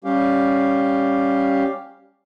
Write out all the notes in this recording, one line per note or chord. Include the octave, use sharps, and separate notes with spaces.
G3 C#4 G4 F5